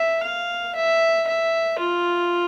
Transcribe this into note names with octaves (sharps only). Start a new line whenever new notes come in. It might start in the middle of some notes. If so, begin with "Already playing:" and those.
Already playing: E5
F5
E5
E5
F4